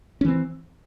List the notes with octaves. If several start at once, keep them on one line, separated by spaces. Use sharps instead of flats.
E3 C4 C#4